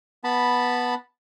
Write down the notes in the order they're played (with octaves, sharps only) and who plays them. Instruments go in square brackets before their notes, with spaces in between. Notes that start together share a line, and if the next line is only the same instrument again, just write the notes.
[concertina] B3 A5 B5